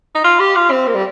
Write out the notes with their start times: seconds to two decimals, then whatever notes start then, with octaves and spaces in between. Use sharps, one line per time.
0.15 D#4
0.24 F4
0.40 G4
0.55 F4
0.71 C4
0.87 A#3
0.95 G3